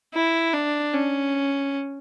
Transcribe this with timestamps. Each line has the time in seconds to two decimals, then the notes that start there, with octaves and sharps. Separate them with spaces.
0.14 E4
0.53 D4
0.93 C#4